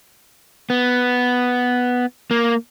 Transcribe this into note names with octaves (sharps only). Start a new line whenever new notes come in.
B3
A#3